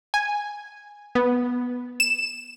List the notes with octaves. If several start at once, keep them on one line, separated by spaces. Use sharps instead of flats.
G#5
B3
E7